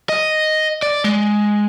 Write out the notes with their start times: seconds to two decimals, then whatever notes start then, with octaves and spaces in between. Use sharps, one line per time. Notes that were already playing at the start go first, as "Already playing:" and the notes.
0.09 D#5
0.83 D5
1.04 G#3